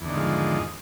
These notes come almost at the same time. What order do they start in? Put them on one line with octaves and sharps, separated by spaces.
E2 D3 D#3 G#2 F3